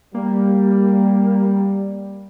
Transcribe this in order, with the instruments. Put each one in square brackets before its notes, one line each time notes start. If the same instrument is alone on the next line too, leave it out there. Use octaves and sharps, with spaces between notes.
[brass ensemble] G3 [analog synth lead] A#3